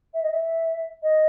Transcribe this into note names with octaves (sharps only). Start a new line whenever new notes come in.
E5
D#5
E5
D#5